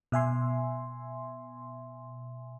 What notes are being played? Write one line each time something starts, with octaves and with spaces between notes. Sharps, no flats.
B2 E5 G#5 C6